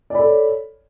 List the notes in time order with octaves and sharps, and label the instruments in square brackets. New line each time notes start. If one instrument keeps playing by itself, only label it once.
[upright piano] D5
B5
A4
C#5